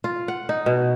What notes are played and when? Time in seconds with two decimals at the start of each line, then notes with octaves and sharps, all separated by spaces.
0.04 F4
0.28 F#5
0.49 D#4
0.66 B2